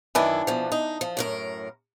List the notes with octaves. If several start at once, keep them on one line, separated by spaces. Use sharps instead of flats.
F#2 D#3 E3 D4 E4
B2 F3
D#4
F3
F#2 A2 A#4